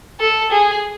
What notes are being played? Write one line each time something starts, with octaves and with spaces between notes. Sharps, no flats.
A4
G#4